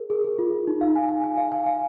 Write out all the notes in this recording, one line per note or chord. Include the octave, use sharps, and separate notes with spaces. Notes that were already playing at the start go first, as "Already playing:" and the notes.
Already playing: G#4 A#4
G#4
G#4
F4
D#4
F5
G#5
G#5
G#5
F5
G#5
F5